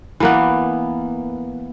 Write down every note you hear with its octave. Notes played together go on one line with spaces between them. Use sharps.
E3 A#3 B3